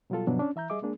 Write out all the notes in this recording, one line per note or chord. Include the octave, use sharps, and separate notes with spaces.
B2 F#3 G3 F4 A4
G2 B2 D#3 F3 F#3 D4
C#4 D4
E3 E5 A#5 G6
G3 G#4 D#5 E5 D6
G#3 A#3 D4 G#4